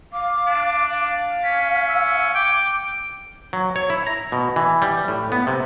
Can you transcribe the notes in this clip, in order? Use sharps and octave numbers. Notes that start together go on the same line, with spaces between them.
F5 D6
D4
F5
C#4 B6
E6
G5 D6
F#3
C#5
E4
A#5
B2
E3
G3
A2
B3
C3